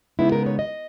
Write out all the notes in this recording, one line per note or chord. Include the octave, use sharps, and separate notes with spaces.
C#3 G#3 B3 D#4 E4
A#4
C#5
D#5